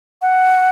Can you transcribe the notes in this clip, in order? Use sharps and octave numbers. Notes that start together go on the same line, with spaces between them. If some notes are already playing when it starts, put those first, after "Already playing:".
F#5